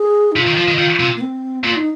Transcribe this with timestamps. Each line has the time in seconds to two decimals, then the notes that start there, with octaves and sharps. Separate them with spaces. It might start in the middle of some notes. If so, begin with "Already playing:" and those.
Already playing: G#4
0.32 D#4
0.35 C3 F4
0.47 D#3
0.57 F3
0.68 D#3
0.78 D#3
1.00 C3
1.16 A#3
1.21 C4
1.64 A#2 F4
1.76 D#4